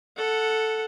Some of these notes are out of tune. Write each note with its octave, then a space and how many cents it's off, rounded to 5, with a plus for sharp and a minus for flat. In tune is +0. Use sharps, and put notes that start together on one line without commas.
A4 +0 F#5 -5